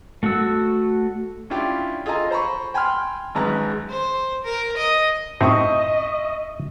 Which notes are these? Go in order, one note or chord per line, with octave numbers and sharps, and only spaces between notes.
A3 F#4 F#5 E6
C#4 D4 E4 F4 G4
F4 G#4 A4 D#5 G#5 A#5
C5 A#5 B5 C#6
G5 G#5 B5 C6 F6
G#1 F#2 G#3 B4 A#5
C5
A#4
D#5
F#2 A2 C4 D#4 D#5 E5 C#6 D#6